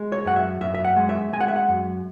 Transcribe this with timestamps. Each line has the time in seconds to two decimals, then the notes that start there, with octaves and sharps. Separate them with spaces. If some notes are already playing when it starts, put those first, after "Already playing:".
Already playing: G#3
0.12 C#5
0.25 F#2 F#5
0.36 E5
0.61 F#2 E5
0.75 E5
0.85 F#5
0.96 G#3
1.09 E5
1.33 G#3 G#5
1.41 F#5
1.48 E5
1.56 F#5
1.69 F#2